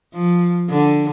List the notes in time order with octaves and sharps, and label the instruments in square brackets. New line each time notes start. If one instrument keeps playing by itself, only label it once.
[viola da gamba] F3
D3